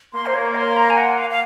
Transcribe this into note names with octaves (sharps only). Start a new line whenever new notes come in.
A#3 C6
C5
C#5
C6
A#5
G#5
F#5
F5
F5